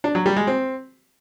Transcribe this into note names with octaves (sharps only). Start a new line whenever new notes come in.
D4
F#3
G3
G#3
C4